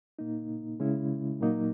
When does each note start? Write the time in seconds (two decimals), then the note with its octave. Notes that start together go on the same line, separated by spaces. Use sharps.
0.19 A#2 A#3 D#4
0.80 C#3 G#3 C#4 E4
1.40 A#2 F#3 A#3 D#4